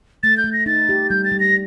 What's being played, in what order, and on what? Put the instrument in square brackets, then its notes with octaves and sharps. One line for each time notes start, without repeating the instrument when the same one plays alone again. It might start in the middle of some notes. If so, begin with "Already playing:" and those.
[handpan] A3 [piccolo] A6
[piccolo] G6
[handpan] A3
[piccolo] A#6
[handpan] D#4 [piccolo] A6
[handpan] G4
[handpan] G3 [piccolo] G6
[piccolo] A6
[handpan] G3
[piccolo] A#6